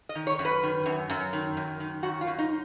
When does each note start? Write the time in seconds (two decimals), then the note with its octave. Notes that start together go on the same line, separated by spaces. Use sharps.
0.09 D#5
0.15 D#3
0.27 C#5
0.39 F#2
0.45 B4
0.63 D#3
0.86 F#2
1.10 F#2
1.33 D#3
1.57 F#2
1.80 D#3
2.03 F#2 F#4
2.21 F4
2.27 F#2
2.39 D#4